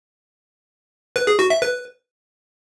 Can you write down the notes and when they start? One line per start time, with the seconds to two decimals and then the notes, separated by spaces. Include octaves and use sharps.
1.16 B4
1.27 G#4
1.39 F#4
1.50 E5
1.62 B4